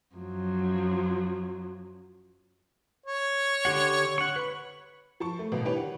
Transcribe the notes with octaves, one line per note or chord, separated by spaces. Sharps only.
F#2 F3 F#3
C#5
D3 G4 F#5
F#5 C#6
B4 B5
F3 A5 C#6
A3
G1 B2
D#3 E3 D4 G4 B4 C#5
F#5